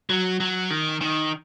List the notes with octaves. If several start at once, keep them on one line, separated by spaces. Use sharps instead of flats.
F#3
F#3
D#3
D#3